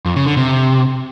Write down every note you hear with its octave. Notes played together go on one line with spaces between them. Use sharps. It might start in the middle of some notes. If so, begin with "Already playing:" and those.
F2
C#3
D3
C3